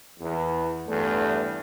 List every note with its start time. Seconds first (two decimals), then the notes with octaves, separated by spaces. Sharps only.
0.20 E2
0.87 E2 G2 A3